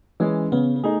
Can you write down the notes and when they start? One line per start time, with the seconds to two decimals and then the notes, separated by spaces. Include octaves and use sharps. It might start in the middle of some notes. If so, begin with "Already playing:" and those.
0.20 E3 G#3 C#4
0.52 C#3 B3
0.76 B3
0.83 A3 D#4 G#4